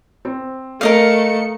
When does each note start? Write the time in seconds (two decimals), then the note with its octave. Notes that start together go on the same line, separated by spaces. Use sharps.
0.25 C4
0.81 A3 A#4 D#5 F5 C#7